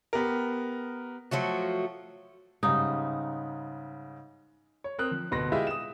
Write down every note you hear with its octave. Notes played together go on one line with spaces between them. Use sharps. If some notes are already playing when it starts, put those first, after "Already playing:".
B3 G4 A#4
F3 F#3 A3 F#4
G#2 C#3 G3 D#4
C#5
C4 A#4 D#6 F#6
F3
D1 B2 B4 C6 A#6
G#3 E4 F4 G4 D#5 E5
D#6 E7